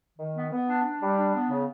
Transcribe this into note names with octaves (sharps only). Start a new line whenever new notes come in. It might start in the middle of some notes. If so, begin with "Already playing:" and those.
D#3
B3
B3
D4
D4
G3
D4
B3
C#3